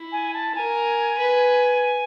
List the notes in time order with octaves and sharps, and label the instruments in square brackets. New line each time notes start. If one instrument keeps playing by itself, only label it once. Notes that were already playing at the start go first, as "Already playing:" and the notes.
Already playing: [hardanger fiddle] E4
[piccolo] G#5
A5
[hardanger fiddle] A#4 [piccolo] G#5
[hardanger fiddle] B4